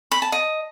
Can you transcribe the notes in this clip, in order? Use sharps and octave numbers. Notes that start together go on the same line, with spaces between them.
B5
A5
D#5